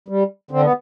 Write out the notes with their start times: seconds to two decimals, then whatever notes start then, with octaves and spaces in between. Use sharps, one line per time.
0.08 G3
0.51 D3 C4
0.62 B3